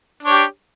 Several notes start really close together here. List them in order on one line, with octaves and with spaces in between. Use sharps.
D4 C#5 G4